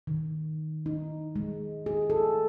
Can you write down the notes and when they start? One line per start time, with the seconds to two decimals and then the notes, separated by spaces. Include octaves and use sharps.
0.07 D#3
0.86 D#4
1.36 G#3
1.86 G#4
2.10 A4